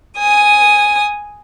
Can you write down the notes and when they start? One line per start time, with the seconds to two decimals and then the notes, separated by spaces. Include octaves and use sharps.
0.18 G#5 D#6